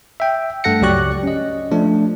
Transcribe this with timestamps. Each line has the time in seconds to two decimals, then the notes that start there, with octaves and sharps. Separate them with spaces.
0.20 E5 G5
0.64 G2 A3 A4 F#5 A#6 C#7
0.82 C#2 F#3 G4 D5 C#6 F#6
1.23 C#4 D#5
1.72 F3 A3 D4